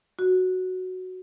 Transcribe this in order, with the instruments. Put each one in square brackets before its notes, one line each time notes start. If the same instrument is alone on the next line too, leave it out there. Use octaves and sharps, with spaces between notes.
[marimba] F#4